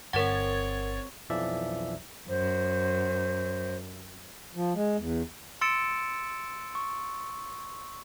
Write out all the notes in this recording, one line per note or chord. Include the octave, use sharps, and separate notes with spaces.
G1 C4 A#4 C#5 F#5 G#6 A6
B1 F2 E3 F3 D5 E5
F#2 C5
F3
G#3
E2
C6 E6 A6 C#7 D7 E7
C#6